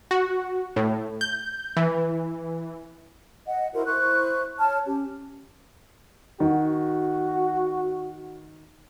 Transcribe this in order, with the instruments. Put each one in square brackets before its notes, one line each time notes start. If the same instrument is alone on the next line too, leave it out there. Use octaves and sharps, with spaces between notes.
[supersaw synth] F#4
A2
G6
E3
[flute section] D#5 F#5
E4 F#4 A#4 C5
E4 C5 C#6 F#6
C#5 A5 F6
C#4 G4
[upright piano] D#3 [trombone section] F#4